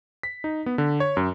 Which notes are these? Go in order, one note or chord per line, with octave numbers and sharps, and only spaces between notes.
B6
D#4
B3
D3
C#5
F#2